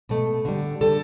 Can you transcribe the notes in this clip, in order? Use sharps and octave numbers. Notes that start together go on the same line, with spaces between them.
B2 A3
D3 G3
D3 G3 A4